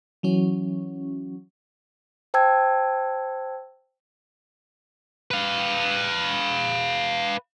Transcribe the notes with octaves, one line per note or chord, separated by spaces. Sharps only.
E3 F#3 C#4
C5 G5 A5 E6 G#6
B4 F5